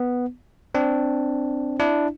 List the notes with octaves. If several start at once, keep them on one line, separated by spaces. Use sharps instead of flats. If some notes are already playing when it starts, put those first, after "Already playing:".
Already playing: B3
C4 D4
D4 E4